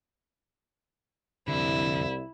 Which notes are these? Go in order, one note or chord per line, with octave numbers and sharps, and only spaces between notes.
C2 F2 D3 E4